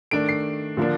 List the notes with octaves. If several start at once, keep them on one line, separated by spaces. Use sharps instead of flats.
D#3 A3 D4 D7
C7
D3 F3 A#3 D4